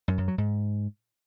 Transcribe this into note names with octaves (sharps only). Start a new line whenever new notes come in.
F#2
F#2
F#3
G#2